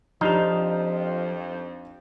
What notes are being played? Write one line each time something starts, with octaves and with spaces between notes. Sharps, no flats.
F2 F3 D4 D#4 G4 C5 F7